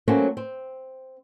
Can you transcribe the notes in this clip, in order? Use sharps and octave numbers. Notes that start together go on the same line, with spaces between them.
F#3 A3 A#3 C4 C#4 F#4
C4